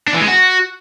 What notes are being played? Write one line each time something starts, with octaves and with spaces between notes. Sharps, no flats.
D4
E3
G#3
F#4